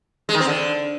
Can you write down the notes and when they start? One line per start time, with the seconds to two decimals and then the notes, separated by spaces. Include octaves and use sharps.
0.29 G#3
0.35 D#3
0.40 C4
0.46 D3